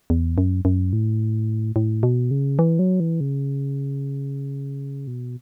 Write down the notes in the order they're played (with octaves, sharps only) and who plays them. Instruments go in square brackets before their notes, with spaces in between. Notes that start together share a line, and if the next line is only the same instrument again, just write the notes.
[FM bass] E2
F#2
F#2
A2
A2
B2
C#3
E3
F#3
E3
C#3
B2